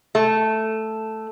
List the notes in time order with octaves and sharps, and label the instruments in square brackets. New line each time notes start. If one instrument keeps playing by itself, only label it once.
[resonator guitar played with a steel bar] A3